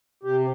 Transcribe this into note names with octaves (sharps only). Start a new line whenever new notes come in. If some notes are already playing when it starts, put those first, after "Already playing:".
C3 G4